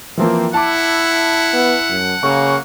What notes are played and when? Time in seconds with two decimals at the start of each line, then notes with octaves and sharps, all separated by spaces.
0.17 E3 F3 A#3 C4
0.54 E4 F#5 A5 D6
1.53 B3
1.90 F#2
2.23 C#3 F#3 A#3 C#6